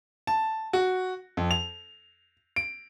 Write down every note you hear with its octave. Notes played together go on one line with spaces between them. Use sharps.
A5
F#4
F2
F7
D7